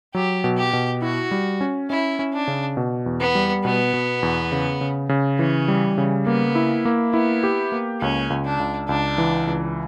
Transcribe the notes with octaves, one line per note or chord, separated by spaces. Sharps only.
F#3 G4
B2
G4
B2
E4 F#4
G3
C#4
C#4 E4
C#4
D4
C#3
B2
E2
B3
G3
B2 B3
B2
E2
C#3
C#3
C#3
E3 C#4
G3
C#3
A#3 B3
E4
A#3
B3 E4
G4
A#3
C#2 C#4
C#2
D4
C#2
C#2 D4
E3
C#2